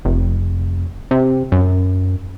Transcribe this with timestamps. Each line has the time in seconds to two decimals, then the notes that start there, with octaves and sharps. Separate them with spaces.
0.05 F1
1.11 C3
1.52 F#2